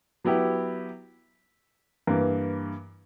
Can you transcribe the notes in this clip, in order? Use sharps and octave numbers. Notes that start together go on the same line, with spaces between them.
F#3 B3 E4 G4
G2 E3 A#3